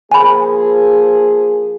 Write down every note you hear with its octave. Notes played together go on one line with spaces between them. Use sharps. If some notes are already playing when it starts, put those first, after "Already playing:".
F3 A#3 G#4 G#5 B5